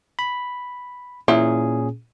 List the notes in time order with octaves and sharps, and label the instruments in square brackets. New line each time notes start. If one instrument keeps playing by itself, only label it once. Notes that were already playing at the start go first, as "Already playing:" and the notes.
[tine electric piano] B5
[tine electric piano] A#2 C#4 G#4 [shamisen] E3